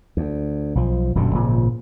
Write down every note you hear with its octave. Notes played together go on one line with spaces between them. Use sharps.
D2
B1 F3
D#1 F#2 B2 D3
G#1 A#2 C#3 F3